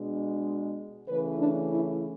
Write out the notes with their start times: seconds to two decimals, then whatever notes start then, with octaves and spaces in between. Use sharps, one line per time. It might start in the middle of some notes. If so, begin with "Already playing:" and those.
Already playing: B2 G#3 D4
1.08 C#3 E3 A3 C#4 B4
1.39 D4
1.71 E4